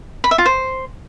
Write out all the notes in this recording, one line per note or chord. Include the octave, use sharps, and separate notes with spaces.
B5
E5
F4
C5